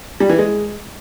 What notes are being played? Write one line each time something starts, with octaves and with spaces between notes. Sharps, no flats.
G3
E3
G#3